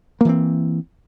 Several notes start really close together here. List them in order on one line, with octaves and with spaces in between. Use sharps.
A#3 E3 C4